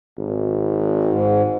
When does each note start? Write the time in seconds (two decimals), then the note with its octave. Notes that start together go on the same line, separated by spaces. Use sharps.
0.18 G#1
1.04 G#2